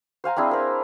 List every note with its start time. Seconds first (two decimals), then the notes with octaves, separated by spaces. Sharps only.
0.24 C5 F5 G#5 A#5
0.36 C4 D4 E4 G#4
0.51 C4 A#4